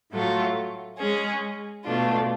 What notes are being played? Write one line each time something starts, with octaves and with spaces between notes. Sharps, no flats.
A2 F#3 A3 F4
G#3 C#4 G#4
B2 A3 D4 F4